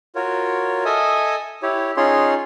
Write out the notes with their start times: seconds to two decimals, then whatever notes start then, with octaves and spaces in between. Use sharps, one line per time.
0.15 F4 F#4 A#4 C#5
0.85 A4 D#5 E5 G#5 D#6
1.63 E4 G4 C#5
1.97 C#4 D#4 F4 G#4 C#5 C6